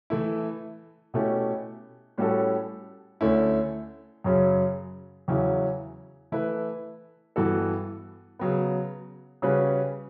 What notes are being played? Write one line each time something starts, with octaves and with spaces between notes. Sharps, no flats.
E3 A3 E4
B2 A3 C#4 E4 G4
A2 G3 C#4 F#4 A4
D2 D3 A3 C#4 E4
F#2 C#3 F#3 C#4
E2 C#3 F#3 C#4 E4
E3 A3 E4 B4
G2 E3 B3 F#4 A4
C#3 F#3 B3
C#3 G3 C#4 F#4 B4